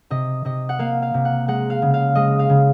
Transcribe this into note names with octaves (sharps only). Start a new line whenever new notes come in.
C3 D#5
C3 D#5
F#5
A#3 F5
F5
C3
F#5
G#3 F#5
F5
C#3
F5
G#3 D#5
F5
C#3